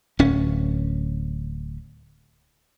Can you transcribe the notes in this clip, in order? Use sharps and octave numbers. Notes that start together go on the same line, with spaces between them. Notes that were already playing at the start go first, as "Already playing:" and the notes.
D1 C#4